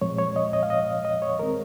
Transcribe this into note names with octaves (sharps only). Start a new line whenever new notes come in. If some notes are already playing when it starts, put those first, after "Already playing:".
A#2 F3 G#3 C4 C#5
C#5
D#5
D#5
F5
D#5
D#5
C#5
D#3 G#3 C4 A#4